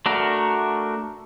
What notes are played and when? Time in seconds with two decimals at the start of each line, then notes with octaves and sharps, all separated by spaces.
0.06 A3 D4 F#4 A#4